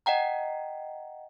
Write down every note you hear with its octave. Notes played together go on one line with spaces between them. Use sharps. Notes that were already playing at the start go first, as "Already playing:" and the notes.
D#5 F#5 G5 A#5